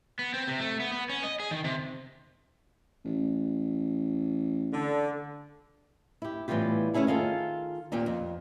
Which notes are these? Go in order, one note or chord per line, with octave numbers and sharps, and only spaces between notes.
B3
C4
C3
A3
B3
B3
C#4
D#5
G#4
D#3
C3
A1
D3
E4 G4
A2 E3 G3 B3 F4 G4
D2 A3 C#4 E4 G#4 A4
D#3 F4 G#4 A4
D#2 A#2 C4 G4 G5
F2